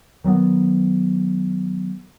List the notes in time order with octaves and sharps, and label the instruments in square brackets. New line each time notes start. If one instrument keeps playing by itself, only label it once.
[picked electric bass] D#3 F#3 G3 B3